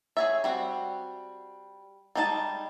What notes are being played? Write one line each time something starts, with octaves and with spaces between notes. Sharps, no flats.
G#4 C#5 E5
G3 C4 F#4
G3 G#3 D#4 A#4 A5